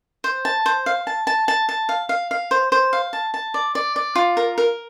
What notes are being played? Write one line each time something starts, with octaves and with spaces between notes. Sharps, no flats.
C5
A5
C5
F5
A5
A5
A5
A5
F5
F5
F5
C5
C5
F5
A5
A5
D5
D5
D5
F4
A#4
A#4